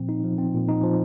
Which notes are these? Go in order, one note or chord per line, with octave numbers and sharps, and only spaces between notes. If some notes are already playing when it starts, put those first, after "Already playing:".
Already playing: A#2 F3 C4
D#4
F3
C4
A#2
D#4
F3